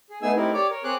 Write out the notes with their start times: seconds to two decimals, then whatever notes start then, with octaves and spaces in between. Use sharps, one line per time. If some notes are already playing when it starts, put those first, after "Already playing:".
0.10 G#4
0.22 A3 B3 D#4 G#4 G#5 E6
0.36 A3 C4 D#4 E4 G4 A#4
0.54 G4 C#5 D5 D6
0.70 A#4 C#5
0.84 C4 G#4 C#5 D6 F#6